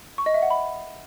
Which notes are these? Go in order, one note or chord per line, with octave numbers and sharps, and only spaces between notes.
C#6
D#5
E5
F#5
B5